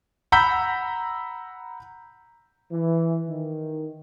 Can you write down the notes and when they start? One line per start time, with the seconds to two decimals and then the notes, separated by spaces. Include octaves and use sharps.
0.32 F#5 A#5 B5 E6 G6 B6
2.71 E3
3.27 D#3